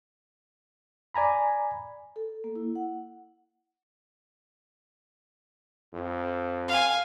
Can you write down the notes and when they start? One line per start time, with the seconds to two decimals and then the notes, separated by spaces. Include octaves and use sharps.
1.15 D5 G#5 A#5 B5
2.16 A4
2.44 A#3
2.55 E4
2.76 F#5
5.94 F2
6.68 F5 G#5